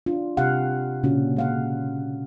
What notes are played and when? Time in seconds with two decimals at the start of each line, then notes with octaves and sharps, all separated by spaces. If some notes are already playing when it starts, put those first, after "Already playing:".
0.06 D4 F4
0.37 C3 C4 G4 F5 F#5
1.03 A#2 C#3 G#3 C#4 D4 F#4
1.36 G#3 F5 F#5